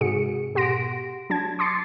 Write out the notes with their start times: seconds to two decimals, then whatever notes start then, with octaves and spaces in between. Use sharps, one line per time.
0.01 G#2 C3 F#4 G#4 C#7
0.55 B2 G4 F#5 C6 A#6 D7
1.30 F#3 D4 A5 G#6
1.59 C6 D6 A6 C7 C#7